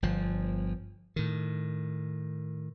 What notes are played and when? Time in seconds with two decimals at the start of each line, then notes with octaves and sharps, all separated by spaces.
0.02 G1 F3
1.16 A2 D#3